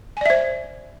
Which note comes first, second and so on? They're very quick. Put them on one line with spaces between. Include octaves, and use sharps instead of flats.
G#5 D5 E5 C5